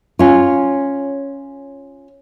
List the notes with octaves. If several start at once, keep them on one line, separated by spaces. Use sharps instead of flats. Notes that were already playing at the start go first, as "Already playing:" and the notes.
C#4 F4